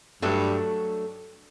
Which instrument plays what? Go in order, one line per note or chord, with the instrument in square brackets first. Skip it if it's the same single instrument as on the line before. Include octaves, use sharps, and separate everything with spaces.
[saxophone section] G2 [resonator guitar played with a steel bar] F#3 A3 D4 A4